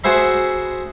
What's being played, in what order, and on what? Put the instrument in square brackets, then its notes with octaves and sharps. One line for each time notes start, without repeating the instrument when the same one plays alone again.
[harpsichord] F#4 G#4 C5 E5 B5